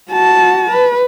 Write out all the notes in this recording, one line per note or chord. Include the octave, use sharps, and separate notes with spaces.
F#4 A5
B4